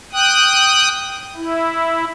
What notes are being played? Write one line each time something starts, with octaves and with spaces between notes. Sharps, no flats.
G5 D#6 F#6
E4